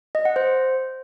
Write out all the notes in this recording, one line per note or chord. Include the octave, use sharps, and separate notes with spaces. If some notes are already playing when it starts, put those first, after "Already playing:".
D#5
F#5
C5